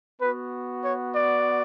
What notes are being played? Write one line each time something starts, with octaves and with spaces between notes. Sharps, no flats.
B3 F#4 B4
C#5
D5